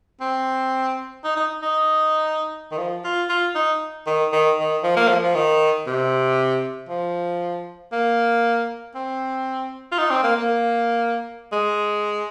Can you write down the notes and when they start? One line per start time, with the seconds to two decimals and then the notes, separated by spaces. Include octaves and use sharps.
0.21 C4
1.24 D#4
1.37 D#4
1.62 D#4
2.72 D#3
2.78 F3
3.04 F4
3.30 F4
3.55 D#4
4.07 D#3
4.32 D#3
4.59 D#3
4.83 F3
4.97 A#3
5.09 F3
5.23 F3
5.35 D#3
5.87 C3
6.89 F3
7.93 A#3
8.95 C4
9.92 F4
9.98 D#4
10.11 C4
10.24 A#3
10.37 A#3
11.53 G#3